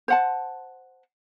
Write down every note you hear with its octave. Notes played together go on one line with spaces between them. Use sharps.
C5 F#5 A5